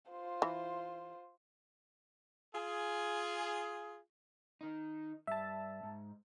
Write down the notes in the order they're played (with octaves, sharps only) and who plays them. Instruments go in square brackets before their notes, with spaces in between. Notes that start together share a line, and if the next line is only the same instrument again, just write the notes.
[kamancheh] F4 C5
[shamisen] E3
[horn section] F4 G#4
[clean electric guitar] D#3 D#4
[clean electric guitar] G2 [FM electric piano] E5 A5
[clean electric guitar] G#2